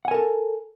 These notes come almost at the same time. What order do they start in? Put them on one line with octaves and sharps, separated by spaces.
F#5 G#5 A#4 A4